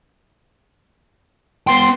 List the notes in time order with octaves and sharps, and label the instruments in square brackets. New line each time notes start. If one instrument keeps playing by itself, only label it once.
[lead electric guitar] B3 G5 [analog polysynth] C6